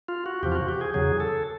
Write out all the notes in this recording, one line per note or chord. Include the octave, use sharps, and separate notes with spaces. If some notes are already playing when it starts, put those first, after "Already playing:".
F4
F#4
E2 C3 F3 G4
F4
F#4
G4
G#4
E2 C#3 F#3 G#4
A4